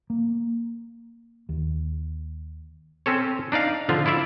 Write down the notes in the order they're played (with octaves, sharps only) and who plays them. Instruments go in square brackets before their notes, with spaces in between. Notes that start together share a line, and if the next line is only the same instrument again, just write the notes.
[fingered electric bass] A#3
D#2
[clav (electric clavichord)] C4 C#4 A4 C#5
D4 D#4 D5 F5
D3 F3 F4
E4 F4 D5 E5